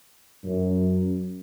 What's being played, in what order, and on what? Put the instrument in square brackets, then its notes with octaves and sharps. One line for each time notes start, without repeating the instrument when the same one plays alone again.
[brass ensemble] F#2